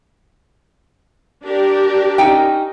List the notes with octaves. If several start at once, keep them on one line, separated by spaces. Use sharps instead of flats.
D4 G4 A#4
C#4 D#4 G5